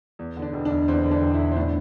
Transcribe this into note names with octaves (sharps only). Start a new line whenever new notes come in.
E2
D3
D4
E1
D4
E1
E2 C4
D3
D4
E1
E4
E1
C4
A2 D4